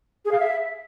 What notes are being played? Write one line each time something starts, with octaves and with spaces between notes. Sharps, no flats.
G#4
F5
E5